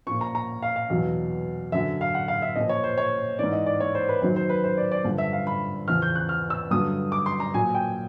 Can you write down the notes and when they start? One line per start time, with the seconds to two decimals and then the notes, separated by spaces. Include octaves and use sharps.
0.07 A#2 F3 C#6
0.21 A#5
0.35 A#5
0.63 F5
0.76 F5
0.90 E2 B2 F#3
1.72 F#2 D3 F#3 E5
2.01 F5
2.15 F#5
2.28 F5
2.42 E5
2.56 A#2 F3 D#5
2.69 C#5
2.84 C5
2.97 C#5
3.39 G#2 E3 D5
3.53 D#5
3.66 D5
3.80 C#5
3.95 C5
4.09 B4
4.22 F#2 D#3 F#3 C5
4.36 C5
4.49 B4
4.64 C5
4.77 D5
4.91 D5
5.05 G2 D3 F3
5.18 E5
5.33 F5
5.47 B5
5.88 E2 C#3 F3 F6
6.02 G6
6.15 F#6
6.29 F6
6.50 E6
6.71 G2 D3 F#3 D#6
7.12 D6
7.26 C6
7.40 A#5
7.54 A#2 F#3 G#5
7.75 G5